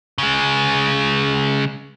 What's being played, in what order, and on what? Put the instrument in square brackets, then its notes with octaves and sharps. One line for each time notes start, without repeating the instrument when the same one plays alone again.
[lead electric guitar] C#3 G#3